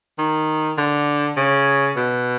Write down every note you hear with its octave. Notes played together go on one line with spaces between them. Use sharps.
D#3
D3
C#3
B2